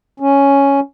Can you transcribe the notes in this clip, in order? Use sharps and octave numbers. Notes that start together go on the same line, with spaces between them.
C#4